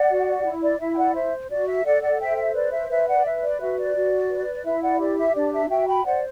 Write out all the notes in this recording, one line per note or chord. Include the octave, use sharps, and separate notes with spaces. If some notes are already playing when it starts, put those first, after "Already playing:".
Already playing: D5 F#5
F#4
E4
D5
E4 E5
G5
D5 F#5
C5 E5
F#4 D5
E5
A4 D5 F#5
D5 F#5
C5 E5 G5
E5
B4 D5
E5
B4 E5
D5 F#5
B4 E5
D5
F#4 E5
D5
F#4
B4
E4 E5
D5 F#5
G4 D5
E5
D4 D5
E5
F#4 E5 G5
G5 B5
C5 D5 F#5